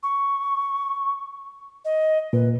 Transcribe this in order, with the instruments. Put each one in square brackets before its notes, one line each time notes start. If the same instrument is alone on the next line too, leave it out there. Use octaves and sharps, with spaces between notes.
[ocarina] C#6
D#5
[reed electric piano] A#2 [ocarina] B4